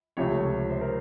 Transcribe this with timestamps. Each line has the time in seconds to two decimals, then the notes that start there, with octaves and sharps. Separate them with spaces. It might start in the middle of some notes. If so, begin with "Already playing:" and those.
0.17 C#2 C3 F3 A3 C#5
0.70 C5
0.81 A#4